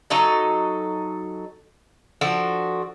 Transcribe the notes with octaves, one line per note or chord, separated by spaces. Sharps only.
F#3 D#4 A4 D#5
F3 D4 F#4 A4